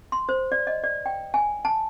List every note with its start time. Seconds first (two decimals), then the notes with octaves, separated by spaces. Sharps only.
0.12 C6
0.29 C5
0.52 D5
0.67 D#5
0.84 D5
1.06 G5
1.34 G#5
1.65 A5